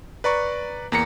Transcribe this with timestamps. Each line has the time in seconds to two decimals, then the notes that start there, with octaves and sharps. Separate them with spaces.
0.24 B4 D5 A#5 C#6
0.92 E2 A#3 A#5 A#6 C#7